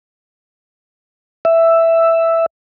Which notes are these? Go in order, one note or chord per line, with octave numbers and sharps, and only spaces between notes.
E5